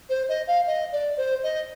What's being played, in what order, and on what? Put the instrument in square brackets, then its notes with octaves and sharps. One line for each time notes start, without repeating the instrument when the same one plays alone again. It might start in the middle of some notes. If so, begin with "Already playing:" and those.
[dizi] C5
D#5
F5
D#5
D5
C5
D#5